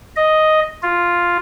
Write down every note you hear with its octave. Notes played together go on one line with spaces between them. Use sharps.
D#5
F4